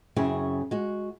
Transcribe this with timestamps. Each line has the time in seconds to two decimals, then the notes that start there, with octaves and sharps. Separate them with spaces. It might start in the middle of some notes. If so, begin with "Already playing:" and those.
0.16 F#2 C#3 C4 E4 G#4
0.71 G#3 F#4